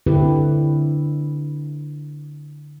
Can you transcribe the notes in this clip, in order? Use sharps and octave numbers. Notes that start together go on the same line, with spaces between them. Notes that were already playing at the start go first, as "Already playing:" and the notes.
D3 C4 E4 G4 B4